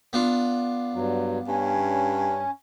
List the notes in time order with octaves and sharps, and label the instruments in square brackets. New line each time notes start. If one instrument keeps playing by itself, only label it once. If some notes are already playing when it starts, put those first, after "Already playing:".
[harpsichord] B3 D4 F4
[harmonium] G2 F#3
[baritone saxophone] G2 [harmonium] C#4